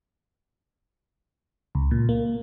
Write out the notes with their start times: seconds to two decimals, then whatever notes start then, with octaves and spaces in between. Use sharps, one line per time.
1.75 C#2
1.91 A#2
2.09 A#3